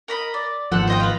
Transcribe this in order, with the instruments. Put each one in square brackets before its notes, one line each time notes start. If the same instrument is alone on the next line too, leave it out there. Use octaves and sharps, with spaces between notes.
[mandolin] A#4 D#5 B5
D5
[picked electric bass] G#1 F3 [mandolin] A4 C5 F#5
[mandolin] C5 D#5 G5
F4 B4